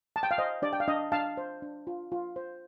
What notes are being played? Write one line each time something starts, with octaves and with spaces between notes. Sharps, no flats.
A5
G5
F5
C5 D#5
D4 D5
G5
F5
D4 D#5
D4 F5 A5
C5
D4
F4
F4
C5